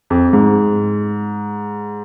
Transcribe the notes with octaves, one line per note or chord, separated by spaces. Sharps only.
F2
G#2